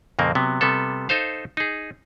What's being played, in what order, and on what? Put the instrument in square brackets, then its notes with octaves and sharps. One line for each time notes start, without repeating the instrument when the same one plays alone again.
[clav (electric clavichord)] F2 A#2 C#3 A#3 C4
C3 F#3 B3
C3 G3 B3 A4
D#4 A4 C5 F5
D#4 G#4